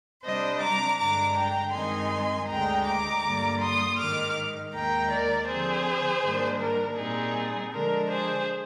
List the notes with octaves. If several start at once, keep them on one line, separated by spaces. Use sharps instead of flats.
C3 G3 D4 C5 D#5
A#5 D6
G2 D3 G#3 D4 A#5 D6
G5 A#5
G2 D#3 G#3 C4 D#4 G#5 C6
D2 D3 G#3 G5 A#5
A#5 D6
G2 D3 G3 A#3
C6 D#6
G#2 D#3 G#3 D#4 D6 F6
D#2 D#3 G#3 G5 A#5
A#4 D5
D3 F3 C4 G#4 C5
G#2 D#3 G3 A#3 D4
A#4
A#2 G3 C4 D#4 G#4
D3 F3 G#3 D4 A#4
G#4 C5